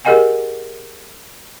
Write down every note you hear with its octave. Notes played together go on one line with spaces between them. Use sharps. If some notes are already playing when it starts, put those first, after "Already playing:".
G4 G#4 A#4 D#5 F#5 G#5